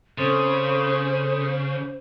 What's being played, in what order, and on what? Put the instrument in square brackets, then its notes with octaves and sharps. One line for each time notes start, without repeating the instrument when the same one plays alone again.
[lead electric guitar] C#3 [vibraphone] C4 A4 D#6 [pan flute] C5